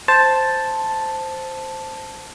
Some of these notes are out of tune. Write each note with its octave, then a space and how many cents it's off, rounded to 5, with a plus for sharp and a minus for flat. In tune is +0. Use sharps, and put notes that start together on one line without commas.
C5 +0 A5 +0